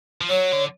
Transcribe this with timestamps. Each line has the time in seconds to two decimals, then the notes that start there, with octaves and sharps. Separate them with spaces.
0.21 F3
0.30 F#3 C#5
0.53 D3